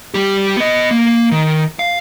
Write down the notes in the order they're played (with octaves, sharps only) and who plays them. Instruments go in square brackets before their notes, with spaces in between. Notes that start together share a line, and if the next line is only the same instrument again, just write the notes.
[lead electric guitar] G3 G4
B3 D#5
A#3
D#3
F5